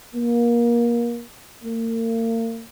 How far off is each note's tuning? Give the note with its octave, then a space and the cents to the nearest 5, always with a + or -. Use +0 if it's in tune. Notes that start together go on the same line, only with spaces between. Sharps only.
A#3 +25
A#3 -40